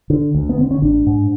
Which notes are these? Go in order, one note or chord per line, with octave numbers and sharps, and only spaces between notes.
D3
D2
B3
D3 C4
C#4
A1 D4
G#2